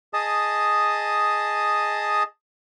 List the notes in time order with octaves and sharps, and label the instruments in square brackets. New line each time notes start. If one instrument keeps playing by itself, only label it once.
[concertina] G#4 D#5 A5 D#6